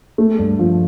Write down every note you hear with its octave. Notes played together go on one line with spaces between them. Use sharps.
A3
G2
F3